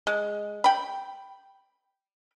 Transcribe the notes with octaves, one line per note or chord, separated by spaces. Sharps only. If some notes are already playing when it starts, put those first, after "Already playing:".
G#3
G5 B5